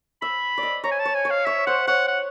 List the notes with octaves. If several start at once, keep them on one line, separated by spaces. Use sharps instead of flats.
E5 B5
D5
D#5
C#5 A#5
G#5
A5
C#5
G#5
C#5
F5
C#5 E5
C5 F#5
C#5 F#5
F#5